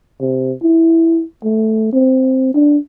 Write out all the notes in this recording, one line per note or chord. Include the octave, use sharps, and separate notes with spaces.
C3
E4
A3
C4
D4